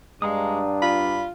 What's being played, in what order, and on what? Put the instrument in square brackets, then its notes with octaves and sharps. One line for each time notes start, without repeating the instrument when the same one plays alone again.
[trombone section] G2 D4 [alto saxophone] G#3 [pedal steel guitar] F5 A#5 D#6
[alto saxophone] F4 [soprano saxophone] B5